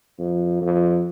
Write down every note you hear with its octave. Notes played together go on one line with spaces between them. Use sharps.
F2
F2